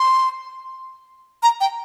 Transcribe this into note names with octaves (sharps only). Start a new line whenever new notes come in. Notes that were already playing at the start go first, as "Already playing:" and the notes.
Already playing: C6
A#5
G5